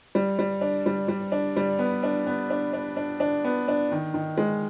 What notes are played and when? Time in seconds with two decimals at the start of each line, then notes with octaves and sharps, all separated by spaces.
0.15 G3
0.39 G3
0.61 D4
0.86 G3
1.08 G3
1.32 D4
1.57 G3
1.79 B3
2.03 D4
2.26 B3
2.50 D4
2.73 D4
2.97 D4
3.20 D4
3.44 B3
3.68 D4
3.92 D#3
4.14 D#3
4.38 G#3